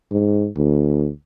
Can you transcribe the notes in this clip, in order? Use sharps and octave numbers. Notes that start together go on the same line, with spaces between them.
G#2
D2